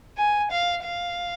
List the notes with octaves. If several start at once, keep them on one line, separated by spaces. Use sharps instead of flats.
G#5
F5
F5